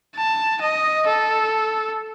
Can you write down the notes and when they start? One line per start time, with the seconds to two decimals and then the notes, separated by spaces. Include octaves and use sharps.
0.17 A5
0.62 D#5
1.08 A4